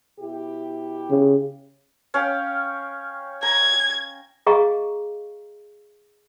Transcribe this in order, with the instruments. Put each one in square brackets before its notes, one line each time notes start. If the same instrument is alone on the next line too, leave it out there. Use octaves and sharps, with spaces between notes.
[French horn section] B2 E4 G4
[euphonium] C#3
[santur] C#4 F5 G5
[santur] A#5 [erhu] G#6
[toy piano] G#4 D#5 F5 A#5 C#6